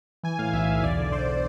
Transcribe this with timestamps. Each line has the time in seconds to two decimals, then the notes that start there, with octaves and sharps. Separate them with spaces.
0.23 E3 G#5
0.39 A2 F5
0.53 B1 E5
0.68 B1
0.83 E2 D5
0.98 D3
1.12 E2 C5